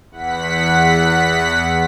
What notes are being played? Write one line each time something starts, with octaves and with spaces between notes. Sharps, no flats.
E2 F#5 B6